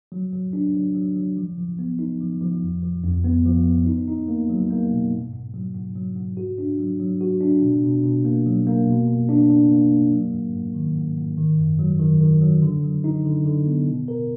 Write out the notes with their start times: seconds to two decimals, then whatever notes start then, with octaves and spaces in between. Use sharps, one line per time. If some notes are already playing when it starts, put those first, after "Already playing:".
0.12 F#3
0.33 F#3
0.53 D4
0.74 F#3
0.95 F#3
1.16 F#3
1.37 F3
1.58 F3
1.79 B3
1.99 D#4
2.20 F3
2.41 F3
2.62 F2
2.82 F3
3.04 F2
3.24 B3
3.45 F3
3.65 B3
3.86 D#4
4.07 D#4
4.28 A#3
4.50 F#3
4.70 A#3
4.91 B2
5.12 G#2
5.33 G#2
5.54 F#3
5.74 G#2
5.95 F#3
6.16 G#2
6.37 F#4
6.58 D4
6.79 F#3
7.00 F#3
7.21 F#4
7.41 D4
7.62 B2
7.83 B2
8.04 B2
8.25 A#3
8.46 F#3
8.67 A#3
8.87 B2
9.08 A#3
9.29 D4
9.50 D4
9.71 A#3
9.92 A#3
10.12 F#3
10.33 G#2
10.53 G#2
10.75 D#3
10.96 G#2
11.17 G#2
11.38 D#3
11.58 F#2
11.79 F#3
11.99 D#3
12.21 D#3
12.41 F#3
12.62 D3
12.83 F#3
13.04 D#4
13.25 D3
13.45 D3
13.66 B3
13.88 B2
14.08 A#4